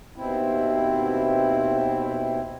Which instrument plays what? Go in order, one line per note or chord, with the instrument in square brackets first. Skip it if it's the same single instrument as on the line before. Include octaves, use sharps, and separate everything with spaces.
[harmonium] D#2 B2 C4 E4